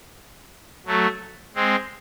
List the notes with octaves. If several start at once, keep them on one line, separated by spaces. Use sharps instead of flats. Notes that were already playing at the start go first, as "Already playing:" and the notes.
F#3 A3
G#3 C4